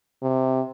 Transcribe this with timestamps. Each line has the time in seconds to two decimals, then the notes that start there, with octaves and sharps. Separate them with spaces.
0.22 C3